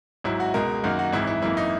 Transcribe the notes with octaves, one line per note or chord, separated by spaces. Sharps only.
G#1 G#2 F#3 E4
F#4
C#2 B2 G#3 A#4
F#2 D#3 A#3 F#4
F#4
G#1 G#2 E3 E4
E4
G#1 F#2 E3 A#3 E4
D#4